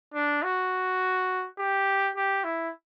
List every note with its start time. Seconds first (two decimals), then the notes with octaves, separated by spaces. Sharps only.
0.14 D4
0.43 F#4
1.59 G4
2.16 G4
2.44 E4